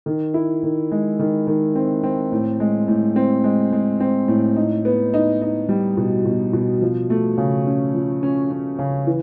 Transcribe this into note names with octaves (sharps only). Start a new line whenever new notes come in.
D#3
E4
D#3
G#3
D#3
D#3
C4
C4
A2
G#3
A2
C4
G#3
G#3
C4
A2
D#4
B3
D#4
D#4
G3
B2
B2
B2
F3
A3
C#3
C#4
F3
C#4
C#4
C#3
E3